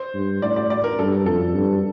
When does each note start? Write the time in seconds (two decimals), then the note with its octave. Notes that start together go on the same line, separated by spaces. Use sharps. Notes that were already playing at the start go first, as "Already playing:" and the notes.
Already playing: C5
0.14 G2
0.42 A2 D5
0.56 D5
0.70 D5
0.84 A#4
0.99 G2 A4
1.26 F2 A4
1.55 G2